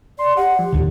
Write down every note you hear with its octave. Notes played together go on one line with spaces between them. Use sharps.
D5 C6
G4 F#5
F3
D1 D#2 D3